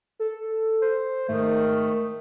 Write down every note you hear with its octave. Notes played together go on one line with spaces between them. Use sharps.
A4
C5
G#2 D#3 A3